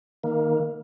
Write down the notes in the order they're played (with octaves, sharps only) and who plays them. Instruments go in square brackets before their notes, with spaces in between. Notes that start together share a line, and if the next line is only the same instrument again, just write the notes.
[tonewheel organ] D#3 A#3